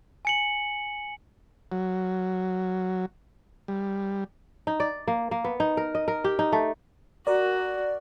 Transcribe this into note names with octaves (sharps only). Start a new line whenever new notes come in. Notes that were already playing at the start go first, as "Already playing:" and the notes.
G#5 C#7 F#7
F#3
G3
D#4
D5
A#3
A#3
B3
D#4
A#4
D#5
A#4
G4
D#4
A3
F#4 A#4 D5